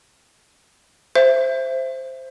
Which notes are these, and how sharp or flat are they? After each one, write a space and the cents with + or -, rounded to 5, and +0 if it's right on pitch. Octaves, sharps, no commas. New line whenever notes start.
C5 +0 E5 +15